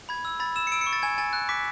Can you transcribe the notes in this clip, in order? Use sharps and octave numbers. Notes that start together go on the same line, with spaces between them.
B5 G#6
E6
B5 A6
E6 E7
C#7
E6 D7
C#7
C#6
A6
G#5 G#6
G#5 A6
F#6
D6 B6